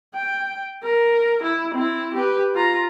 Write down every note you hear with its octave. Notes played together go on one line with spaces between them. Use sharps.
G5
A#4
E4
C4 E4
G4 B4
F4 A#5